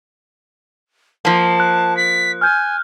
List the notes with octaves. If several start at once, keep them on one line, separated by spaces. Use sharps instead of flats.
F3 A#3 A5
F#6
B6
G#5 F6 G6